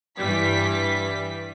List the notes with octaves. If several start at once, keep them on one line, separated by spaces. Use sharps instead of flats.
G2 E3 G3 B6